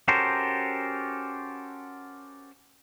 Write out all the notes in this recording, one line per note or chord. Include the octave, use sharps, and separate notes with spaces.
C#4 F#4 G4 A4 A#4 C5